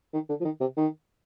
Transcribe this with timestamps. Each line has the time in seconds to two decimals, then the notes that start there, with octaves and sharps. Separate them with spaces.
0.13 D#3
0.29 D3
0.40 F3
0.45 D#3
0.60 C3
0.77 D#3